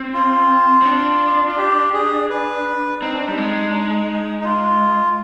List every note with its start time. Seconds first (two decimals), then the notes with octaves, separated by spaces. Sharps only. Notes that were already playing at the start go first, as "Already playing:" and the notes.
Already playing: C4
0.14 F4
0.82 C4
0.86 D4
1.48 F4
1.57 G4
1.93 G#4
2.30 B4
3.01 C4 D#4
3.14 D4
3.26 G3 D#4
3.38 G#3
3.70 D4
3.74 D#4
4.40 D#4
4.45 F4